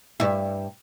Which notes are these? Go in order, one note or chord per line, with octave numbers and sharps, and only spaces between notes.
G2 E5